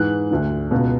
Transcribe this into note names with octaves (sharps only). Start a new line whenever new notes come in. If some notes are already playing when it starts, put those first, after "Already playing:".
Already playing: G#2 E3 F#6
D2 D3
C#2 B2